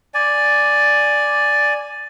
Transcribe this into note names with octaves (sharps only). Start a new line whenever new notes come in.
D5 G#5